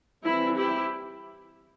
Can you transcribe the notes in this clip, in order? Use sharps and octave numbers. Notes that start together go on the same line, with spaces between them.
E3 G3 C4 E4
E4 G4